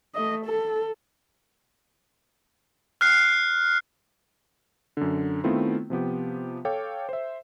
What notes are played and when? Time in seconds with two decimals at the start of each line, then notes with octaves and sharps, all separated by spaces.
0.15 A3 D#5
0.46 A4
3.01 F6 F#6 C7
4.97 F#2 D3
5.44 D#3 A3 B3 C4 E4 F4
5.90 C3 F3 B3 G4
6.65 A4 C#5 F5 G5 D6
7.09 C5 E5